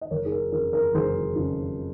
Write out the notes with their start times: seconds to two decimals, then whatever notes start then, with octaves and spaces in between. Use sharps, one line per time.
0.01 D#5
0.11 F#1 A#4 C#5
0.25 G#4
0.32 A#4
0.52 F2 C#3 A#4
0.73 A#4
0.94 F#1 G#4 C5
1.35 F2 C#3